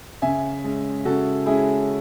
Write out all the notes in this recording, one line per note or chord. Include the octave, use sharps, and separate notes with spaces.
C#3 E5 G#5
G#3 C#4
C#3 F#4 A4
G#3 C#4 E4 G#4